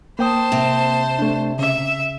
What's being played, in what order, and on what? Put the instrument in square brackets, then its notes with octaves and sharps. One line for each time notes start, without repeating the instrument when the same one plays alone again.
[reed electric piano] A#3 G5 D#6 [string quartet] C5 A5
[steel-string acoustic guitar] C3
[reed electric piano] A3 D4
[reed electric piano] C#3 [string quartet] E5